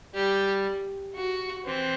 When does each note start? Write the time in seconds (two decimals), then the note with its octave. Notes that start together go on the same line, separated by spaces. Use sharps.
0.14 G3 G4
1.15 F#4
1.65 E3 C4